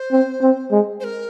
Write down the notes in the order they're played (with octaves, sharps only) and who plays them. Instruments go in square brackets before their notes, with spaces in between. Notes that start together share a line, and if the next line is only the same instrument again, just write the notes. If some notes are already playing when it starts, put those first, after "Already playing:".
Already playing: [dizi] C5
[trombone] C4
C4
G#3
[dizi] C5
A#4